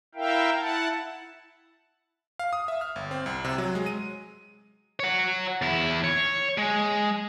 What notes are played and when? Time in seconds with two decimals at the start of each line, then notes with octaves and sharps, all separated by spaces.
0.15 E4 A#4 E5 F5 G5
0.58 E4 F#5 A5
2.39 F5
2.53 D#6
2.68 E5
2.81 F6
2.96 G1
3.11 C4
3.26 C2
3.44 C3
3.58 F#3
3.75 G#3
3.86 D#7
5.00 C#5 F#5
5.62 E2 E4
6.04 C#5
6.58 G#3